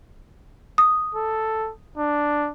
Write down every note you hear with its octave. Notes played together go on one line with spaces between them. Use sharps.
D#6
A4
D4